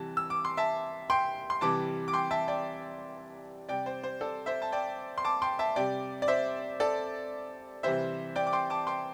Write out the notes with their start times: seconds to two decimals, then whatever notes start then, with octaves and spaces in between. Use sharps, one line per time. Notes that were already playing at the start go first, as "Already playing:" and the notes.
Already playing: C3 E3 G3 A5
0.17 E6
0.30 D6
0.45 C6
0.57 E5 A5
1.10 G5 C6
1.50 C6
1.61 C3 E3 G3 A5 D6
2.08 D6
2.13 G5 C6
2.31 E5 A5
2.48 D5 G5
3.69 C3 G3 D5 G5
3.86 C5
4.03 C5
4.21 A4 D5
4.46 C5 E5
4.62 A5
4.72 D5 G5
5.18 C6
5.24 A5 D6
5.42 G5 C6
5.59 E5 A5
5.76 C3 G3 D5 G5
6.22 D5
6.28 C5 E5
6.80 A4 D5
7.83 C3 E3 G3 C5 E5
8.36 D5 G5
8.47 D6
8.53 G5 C6
8.70 A5 D6
8.87 G5 C6